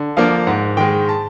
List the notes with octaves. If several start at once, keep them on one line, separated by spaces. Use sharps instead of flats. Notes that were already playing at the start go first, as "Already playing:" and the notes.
Already playing: D3
F3 A#3 D4 F5
G#2 F#5
D#3 G#3 G5
A5